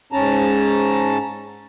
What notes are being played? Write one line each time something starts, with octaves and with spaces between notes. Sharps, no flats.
G#2 C#4 A5 A#5